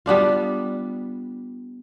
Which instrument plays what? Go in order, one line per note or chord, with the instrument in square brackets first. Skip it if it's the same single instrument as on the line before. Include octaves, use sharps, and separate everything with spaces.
[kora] G3 B3 D4 F4